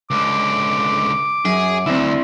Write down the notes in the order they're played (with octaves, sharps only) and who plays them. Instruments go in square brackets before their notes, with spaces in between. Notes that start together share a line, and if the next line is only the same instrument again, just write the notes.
[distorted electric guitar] C#2 D3 [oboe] D6
[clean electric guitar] F#2 [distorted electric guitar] G#4
[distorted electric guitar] D2 [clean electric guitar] C4 E4